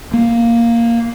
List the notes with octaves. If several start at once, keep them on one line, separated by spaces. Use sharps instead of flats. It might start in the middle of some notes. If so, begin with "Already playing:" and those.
A#3